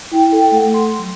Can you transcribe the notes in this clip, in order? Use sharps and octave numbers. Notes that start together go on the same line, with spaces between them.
E4 G5
A4 G5
A3 A4 F#5
C6
F#3